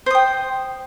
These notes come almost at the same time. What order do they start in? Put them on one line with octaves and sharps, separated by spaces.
C5 D#6 G5